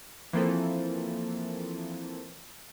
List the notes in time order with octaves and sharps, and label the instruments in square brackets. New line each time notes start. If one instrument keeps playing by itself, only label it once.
[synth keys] E3 F3 A#3 C4 A4